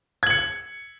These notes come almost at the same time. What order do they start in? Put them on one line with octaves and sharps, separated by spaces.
G#6 F#7 C#7